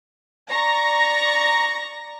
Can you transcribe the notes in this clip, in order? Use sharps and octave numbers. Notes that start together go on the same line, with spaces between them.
D5 A#5 C#6 A#6